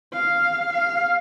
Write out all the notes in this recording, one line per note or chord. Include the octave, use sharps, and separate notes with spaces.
F5
F5